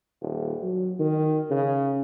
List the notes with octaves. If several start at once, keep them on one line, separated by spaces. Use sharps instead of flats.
D#1
F#3
D#3
C#3